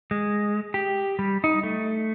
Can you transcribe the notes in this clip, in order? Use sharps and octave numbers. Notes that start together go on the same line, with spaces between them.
G#3
G4
G3
D#4
A3